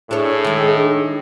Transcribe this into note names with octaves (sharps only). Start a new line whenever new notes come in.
A2 D4 G#4 C#5
D#3 G#3 D#4
D4